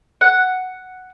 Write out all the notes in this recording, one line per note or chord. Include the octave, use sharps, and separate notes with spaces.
F#5